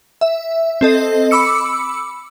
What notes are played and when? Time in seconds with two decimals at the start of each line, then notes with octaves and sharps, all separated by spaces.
0.21 E5
0.81 C4 A4 D#5
1.31 B5 D6 E6 C#7